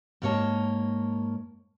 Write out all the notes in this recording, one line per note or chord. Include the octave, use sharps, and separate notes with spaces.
G#2 A#3 A#4 C#5 D#5 A5